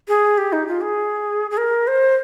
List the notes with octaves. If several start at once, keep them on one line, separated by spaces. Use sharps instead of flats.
G#4
G4
D#4
F4
G#4
G#4
A#4
C5